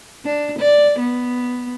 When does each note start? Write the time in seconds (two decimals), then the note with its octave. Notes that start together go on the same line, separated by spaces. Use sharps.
0.25 D4
0.59 D5
0.99 B3